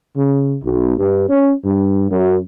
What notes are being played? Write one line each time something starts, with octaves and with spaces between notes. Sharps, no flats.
C#3
B1
G2
C#4
G2
F#2